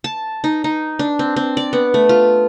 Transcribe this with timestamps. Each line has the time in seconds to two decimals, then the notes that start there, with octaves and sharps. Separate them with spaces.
0.04 A5
0.44 D#4
0.64 D#4
0.99 D4
1.19 C4
1.36 C4
1.57 D5
1.73 B3
1.94 A3
2.09 F4